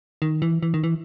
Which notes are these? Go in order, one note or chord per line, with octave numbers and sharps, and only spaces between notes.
D#3
E3
E3
D#3
E3